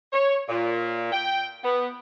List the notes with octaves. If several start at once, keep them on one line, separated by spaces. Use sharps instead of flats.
C#5
A#2
G5
B3